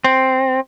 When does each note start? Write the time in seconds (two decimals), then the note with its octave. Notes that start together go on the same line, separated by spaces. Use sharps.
0.04 C4